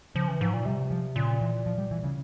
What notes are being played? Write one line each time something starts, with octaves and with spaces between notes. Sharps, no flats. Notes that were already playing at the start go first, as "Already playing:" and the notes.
C#3 F3
E3
G#2 F3
A#2
C3 G3
F3
A#2 C#3
E3
F3
G3
E3
C#3